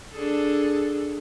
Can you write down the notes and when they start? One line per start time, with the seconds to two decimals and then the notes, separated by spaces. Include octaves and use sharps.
0.13 D4 G#4 A4